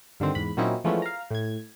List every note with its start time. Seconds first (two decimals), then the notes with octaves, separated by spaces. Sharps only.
0.20 G2 D3 D#3 C4
0.35 E2 G#2 B5
0.57 A#2 F#3 C4 C#4 D#4 E4
0.84 E3 F3 G#3 A3 B3 C#4
1.02 F5 A#5
1.31 A2 G#6